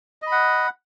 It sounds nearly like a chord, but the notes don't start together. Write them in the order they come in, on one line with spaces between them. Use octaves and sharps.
D#5 B5 F#5